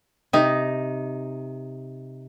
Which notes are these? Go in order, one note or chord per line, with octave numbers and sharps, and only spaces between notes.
C3 D#4